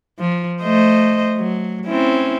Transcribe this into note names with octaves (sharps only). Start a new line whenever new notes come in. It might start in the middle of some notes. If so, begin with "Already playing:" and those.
F3
A3 C5 D#5
F#3
C4 C#4 E4